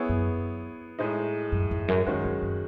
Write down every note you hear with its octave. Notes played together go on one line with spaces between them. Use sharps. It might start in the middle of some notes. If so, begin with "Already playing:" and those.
Already playing: B3 E4 G#4 C#5
F#2
A2 G#3 D#4
F#2
E2
F#2
F#2 D#3 G#3 C#4 F#4
F#2
F#2